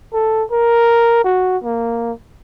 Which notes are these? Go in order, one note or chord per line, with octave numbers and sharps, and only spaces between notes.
A4
A#4
F#4
A#3